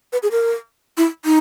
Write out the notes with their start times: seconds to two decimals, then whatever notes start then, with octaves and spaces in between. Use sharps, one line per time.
0.13 B4
0.23 G#4
0.31 A#4
0.97 E4
1.25 D#4